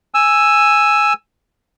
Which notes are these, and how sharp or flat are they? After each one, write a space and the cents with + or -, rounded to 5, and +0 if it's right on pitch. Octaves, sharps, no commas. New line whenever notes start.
G#5 +0 E6 +5